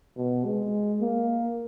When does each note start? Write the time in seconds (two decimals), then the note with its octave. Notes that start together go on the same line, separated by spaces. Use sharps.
0.17 B2
0.45 G#3
1.01 A#3